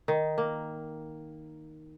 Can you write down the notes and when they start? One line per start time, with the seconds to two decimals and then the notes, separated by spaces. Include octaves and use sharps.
0.08 D#3
0.38 A#3